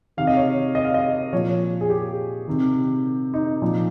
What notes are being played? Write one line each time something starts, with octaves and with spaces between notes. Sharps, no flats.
C3 D#3 F5
D#5
C#5
D#5
F5
D#5
A#2 F3 C#5
G#4
G4
C3 D#3
D#4
A#2 F3